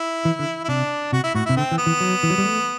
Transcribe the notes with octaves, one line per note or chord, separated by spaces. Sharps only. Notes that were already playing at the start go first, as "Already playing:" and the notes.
Already playing: E4
E3
D3
E4
C3 D4
C3 F#4
E4
A2 F#4
C3 E4
D3 C4
E3
B3
E3
F#3
E3
F#3
G3
A3